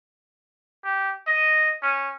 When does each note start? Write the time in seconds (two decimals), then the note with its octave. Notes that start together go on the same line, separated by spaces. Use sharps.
0.85 G4
1.27 D#5
1.82 C#4